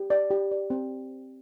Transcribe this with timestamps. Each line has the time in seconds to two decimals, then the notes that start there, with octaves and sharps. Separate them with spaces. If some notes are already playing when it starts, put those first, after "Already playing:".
Already playing: G4
0.10 D5
0.31 G4
0.51 D5
0.70 C4